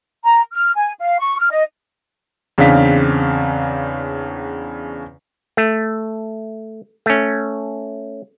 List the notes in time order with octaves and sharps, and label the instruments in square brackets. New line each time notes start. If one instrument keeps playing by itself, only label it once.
[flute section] A#5
F6
G#5
F5
C#6
F6
D#5
[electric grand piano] E2 C#3 C4 D4 F5 B6
[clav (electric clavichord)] A3
A3 C#4